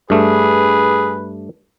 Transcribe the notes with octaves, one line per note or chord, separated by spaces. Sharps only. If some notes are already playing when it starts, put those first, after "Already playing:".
G2 A3 G#4 B4